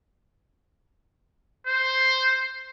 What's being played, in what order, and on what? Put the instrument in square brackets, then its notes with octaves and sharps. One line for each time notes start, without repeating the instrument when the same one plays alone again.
[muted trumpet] C5